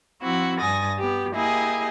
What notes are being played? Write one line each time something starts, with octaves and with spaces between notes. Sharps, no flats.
F3 C4 E4 F#4
G2 G#5 D#6 A6 A#6
B3 G4
A#3 E4 G4 G#4 D#5